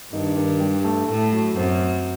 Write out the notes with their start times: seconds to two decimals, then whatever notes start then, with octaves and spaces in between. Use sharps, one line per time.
0.13 G2 D#3 D#4
0.37 D#3 D#4
0.60 G3 G4
0.84 A3 A4
1.08 A2 A3 A4
1.32 F#3 F#4
1.56 F#2 C4 C5